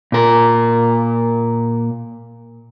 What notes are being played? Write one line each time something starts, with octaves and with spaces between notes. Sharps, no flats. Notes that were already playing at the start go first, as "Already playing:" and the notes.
A#2 A#4